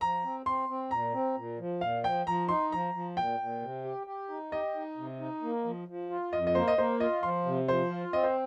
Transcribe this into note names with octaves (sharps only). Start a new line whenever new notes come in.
F3 A#5
C4
C4 C6
C4
A#2 A#5
C4
A#2
F3
A#2 F5
F3 G5
F3 A#5
D#4 C6
F3 A#5
F3
A#2 G5
A#2
C3
G4
G4
D#4
G4 D#5
D#4
C3
D#4
A#3
F3
F3
F4
F2 D#5
D#5
A#3 C5
D#5
A#3 C5
F4 D#5
F3 C6
C3
F3 C5
F4
C4 D#5
C5